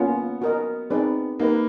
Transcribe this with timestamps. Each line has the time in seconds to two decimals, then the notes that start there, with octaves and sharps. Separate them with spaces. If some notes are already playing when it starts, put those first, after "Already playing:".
Already playing: A#3 B3 C#4 F4
0.42 F#4 A#4 D#5
0.90 C4 D#4 G#4 B4 D5
1.39 A#3 D#4 G4 B4